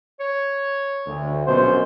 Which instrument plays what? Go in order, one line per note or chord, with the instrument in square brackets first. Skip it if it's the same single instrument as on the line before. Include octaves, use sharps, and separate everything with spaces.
[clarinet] C#5
[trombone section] D2
[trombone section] A#1 F#2 B2 [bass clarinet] C5